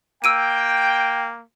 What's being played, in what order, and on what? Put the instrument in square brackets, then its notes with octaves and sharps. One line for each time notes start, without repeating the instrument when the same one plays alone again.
[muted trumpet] A#3 [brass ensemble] G5 [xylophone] E6 D7 D#7